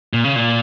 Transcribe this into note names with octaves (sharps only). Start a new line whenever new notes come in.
A#2
C#3
A#2